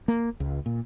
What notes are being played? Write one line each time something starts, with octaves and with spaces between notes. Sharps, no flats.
A#3
C#2
A#2